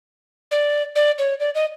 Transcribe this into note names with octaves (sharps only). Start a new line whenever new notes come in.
D5
D5
C#5
D5
D#5